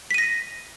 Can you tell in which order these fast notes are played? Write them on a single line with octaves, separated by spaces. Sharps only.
B6 D#7 A#6